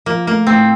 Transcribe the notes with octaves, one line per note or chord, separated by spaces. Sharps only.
F3 A#3
A3 A#3
A2 C4